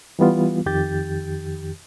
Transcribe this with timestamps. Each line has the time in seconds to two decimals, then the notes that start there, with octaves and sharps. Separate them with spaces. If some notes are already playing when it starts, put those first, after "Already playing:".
0.19 E3 G3 B3 F4
0.66 F2 D#3 G4 G6 A6